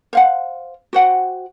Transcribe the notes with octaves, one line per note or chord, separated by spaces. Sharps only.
C5 F5 F#5
F#4 C5 F#5 G5